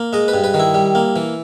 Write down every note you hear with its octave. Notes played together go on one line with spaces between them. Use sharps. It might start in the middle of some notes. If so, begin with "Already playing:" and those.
Already playing: A#3
G#3 D#5
B4
G2
B4
D#3
E4
G3
A#3
E3